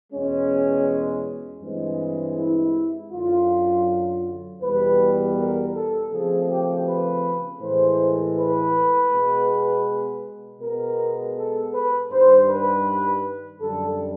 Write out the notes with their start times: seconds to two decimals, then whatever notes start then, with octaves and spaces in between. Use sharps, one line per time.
0.12 E2 B2 G#3 C#4
1.61 G2 E3 G#3 C4
2.36 E4
3.12 F#2 D3 F#3 F4
4.61 E2 B2 G3 B3 B4
5.37 A#4
5.74 A4
6.12 C#3 F3 A3 C4 G#4
6.49 G4
6.86 B4
7.61 A2 E3 G#3 C5
8.37 B4
9.11 B2 G#3 B3
10.61 B2 G#3 B3 A#4
11.36 A4
11.73 B4
12.11 G2 D#3 G3 C5
12.48 B4
13.60 F#2 D3 G3 A4